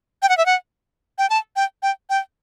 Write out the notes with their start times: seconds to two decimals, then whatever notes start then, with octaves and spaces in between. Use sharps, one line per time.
0.22 G5
0.29 F#5
0.38 E5
0.46 F#5
1.18 G5
1.30 A5
1.56 G5
1.83 G5
2.10 G5